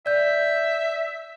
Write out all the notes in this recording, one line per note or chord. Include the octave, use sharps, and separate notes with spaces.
D5 E5 G6